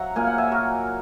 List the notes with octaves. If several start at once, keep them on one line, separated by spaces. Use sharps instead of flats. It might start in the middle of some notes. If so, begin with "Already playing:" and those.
Already playing: F#3 E5 F#5 A#5
A#2 A#3 G#5
F#5
E5 G#5
F#4 A#4